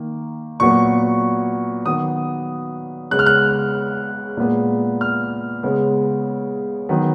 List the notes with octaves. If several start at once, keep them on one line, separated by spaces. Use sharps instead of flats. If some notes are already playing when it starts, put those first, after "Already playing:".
Already playing: D#3 A#3
A#2 F#3 B3 C#6
D#3 F#3 B3 D#6
C#3 G#3 B3 F#6
F6
F#6
A#2 G#3 B3
F6
C#3 G#3 B3
D#3 F#3 B3